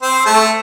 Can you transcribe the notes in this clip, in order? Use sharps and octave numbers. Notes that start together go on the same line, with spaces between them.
C4 C5
A3 A4